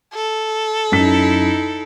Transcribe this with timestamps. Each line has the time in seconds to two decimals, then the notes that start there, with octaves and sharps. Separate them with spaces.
0.14 A4
0.92 F#2 D#4 E4 B6